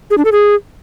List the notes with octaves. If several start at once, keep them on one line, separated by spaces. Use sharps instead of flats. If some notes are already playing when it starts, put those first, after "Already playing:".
G#4
D4
A4
G#4